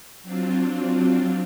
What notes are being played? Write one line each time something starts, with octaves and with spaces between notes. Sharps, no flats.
F#3 C4 D4 F4